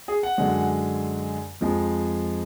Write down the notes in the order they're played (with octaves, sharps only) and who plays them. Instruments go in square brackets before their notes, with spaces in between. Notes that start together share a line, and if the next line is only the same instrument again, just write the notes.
[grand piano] G#4
F#5
F#2 D3 G#3
F2 F3 G#3